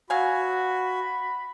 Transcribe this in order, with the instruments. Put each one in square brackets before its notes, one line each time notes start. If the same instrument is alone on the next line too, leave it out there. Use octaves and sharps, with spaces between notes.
[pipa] F#3 F5 G#5 [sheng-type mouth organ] F#4 [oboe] B5